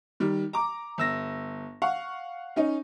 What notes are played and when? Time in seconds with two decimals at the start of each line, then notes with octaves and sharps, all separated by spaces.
0.20 D#3 G3
0.53 A#5 D6
0.98 G1 E6 A#6
1.82 F5 F#5 C#6
2.56 C#4 D#4